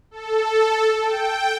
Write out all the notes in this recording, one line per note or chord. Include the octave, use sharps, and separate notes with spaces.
A4
G5